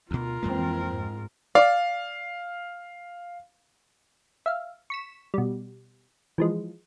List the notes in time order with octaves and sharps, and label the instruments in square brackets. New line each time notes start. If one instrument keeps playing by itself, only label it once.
[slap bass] D2 B2 [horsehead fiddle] F4 A#4
[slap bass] F2 G#3 A#3 [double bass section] E3 C4
[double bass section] G#2
[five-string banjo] D5 [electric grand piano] F5
[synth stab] E5 F5
C#6 B6 E7
B2 G3
E3 F3 G#3